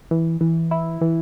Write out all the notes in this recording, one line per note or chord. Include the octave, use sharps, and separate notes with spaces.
E3
E3
E4
E3